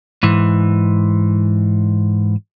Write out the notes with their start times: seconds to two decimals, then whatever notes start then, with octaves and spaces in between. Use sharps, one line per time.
0.23 G#2 E3